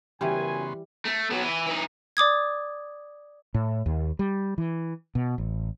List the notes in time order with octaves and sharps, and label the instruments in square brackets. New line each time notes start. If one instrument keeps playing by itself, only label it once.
[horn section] F#2 G#5 [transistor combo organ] C#3 B3 C6 [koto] E3 G3 [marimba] G4
[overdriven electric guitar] A3
F#3 B3
E3
E3 D#4
[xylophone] D5 D6 D#6 G#6
[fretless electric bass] A2
D#2
G3
E3
B2
A1